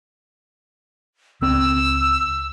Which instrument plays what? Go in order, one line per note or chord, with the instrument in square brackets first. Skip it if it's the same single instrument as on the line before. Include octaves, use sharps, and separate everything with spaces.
[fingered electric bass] C#2 C4 [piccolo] E6